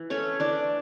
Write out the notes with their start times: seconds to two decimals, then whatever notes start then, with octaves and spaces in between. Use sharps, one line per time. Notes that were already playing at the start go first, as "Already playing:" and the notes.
Already playing: E3
0.10 A3 C#4 C#5
0.40 E3 D4 D5